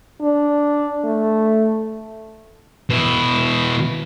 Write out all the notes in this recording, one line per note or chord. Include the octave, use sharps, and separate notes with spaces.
D4
A3
B2 E4